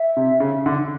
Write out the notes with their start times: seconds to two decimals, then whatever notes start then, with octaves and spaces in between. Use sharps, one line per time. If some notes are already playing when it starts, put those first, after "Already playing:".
Already playing: E5
0.17 C3
0.40 C#3
0.66 D3